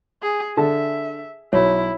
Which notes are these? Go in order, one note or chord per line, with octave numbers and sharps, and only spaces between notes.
G#4
D3 E5 A5
B1 E4 C#5